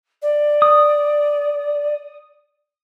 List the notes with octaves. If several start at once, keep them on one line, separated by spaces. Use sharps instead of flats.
D5
D#6